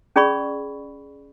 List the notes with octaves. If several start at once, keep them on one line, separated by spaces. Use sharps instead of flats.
C#4 G#4 D5 B5 C#6